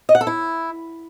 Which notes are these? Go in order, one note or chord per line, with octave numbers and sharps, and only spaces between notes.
D#5
F#5
A4
E4